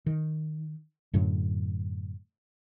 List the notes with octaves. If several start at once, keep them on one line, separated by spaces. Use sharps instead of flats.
D#3
F#2 A2 D3 F#3